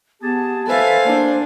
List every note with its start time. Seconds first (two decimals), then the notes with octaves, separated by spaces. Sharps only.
0.22 B3 G4 G#4 A5
0.67 A4 B4 C5 E5 F5 G#5
1.04 A#3 D4